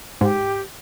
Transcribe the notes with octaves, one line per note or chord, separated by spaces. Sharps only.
G#2 G4